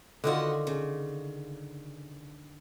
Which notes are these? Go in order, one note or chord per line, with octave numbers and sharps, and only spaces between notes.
D3 D#3 F4 F#4 B4 D#5
C#3